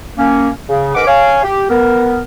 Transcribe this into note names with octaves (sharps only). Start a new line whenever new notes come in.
A#3 C#4
C#3
G#2 A#4 B4 F#5 D6
C#5 F5 G#5
G4
B3 A#4